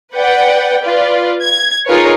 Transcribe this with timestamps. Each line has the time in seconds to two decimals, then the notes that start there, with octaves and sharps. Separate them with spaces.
0.16 B4 D5 F#5 G5
0.83 F4 B4 D5
1.42 G#6
1.86 D#4 F4 G#4 A#4 B4 C#5